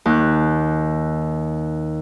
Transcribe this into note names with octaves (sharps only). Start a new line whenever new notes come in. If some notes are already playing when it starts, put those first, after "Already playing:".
D#2 F#6